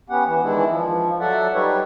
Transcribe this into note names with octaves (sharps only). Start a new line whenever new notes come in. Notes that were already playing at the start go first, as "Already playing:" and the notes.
B3 C#4 G4 F#5
E3
D#3 E3 G#3 D4 E4
F3
F#3 A4 D5 E5 F#5
G3 D#4 G4 B4 C#5